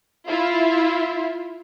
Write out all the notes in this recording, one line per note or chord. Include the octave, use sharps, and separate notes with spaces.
E4 F4 E5